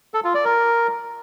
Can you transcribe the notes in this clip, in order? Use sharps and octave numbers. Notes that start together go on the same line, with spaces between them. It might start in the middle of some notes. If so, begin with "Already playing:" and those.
A4
F4
D5
A#4